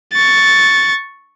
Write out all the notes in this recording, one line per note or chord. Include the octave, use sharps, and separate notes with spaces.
C#6 A6